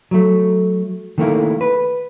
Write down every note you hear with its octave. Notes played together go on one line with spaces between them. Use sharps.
F#3 A3
D#3 A3 A#3 E4
B4